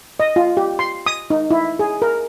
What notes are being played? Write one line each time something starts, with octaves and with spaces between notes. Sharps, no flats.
D#5
F4
G4
C6
D#6
D#4
E4
G#4
A#4